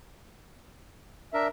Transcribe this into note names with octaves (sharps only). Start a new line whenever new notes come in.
D4 A#4 E5